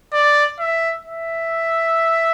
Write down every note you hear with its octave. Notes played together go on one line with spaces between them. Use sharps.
D5
E5
E5